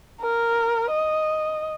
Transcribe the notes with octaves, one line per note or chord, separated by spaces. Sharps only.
A#4
D#5